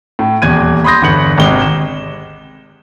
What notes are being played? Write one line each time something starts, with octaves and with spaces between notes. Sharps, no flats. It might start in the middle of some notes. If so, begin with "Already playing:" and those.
A2
D#1 E2 G#6 D#7
B5 C6 D#6 G6 A#6
G1 E2 B3 C#7 F#7
G#1 C3 G#3 G7
E7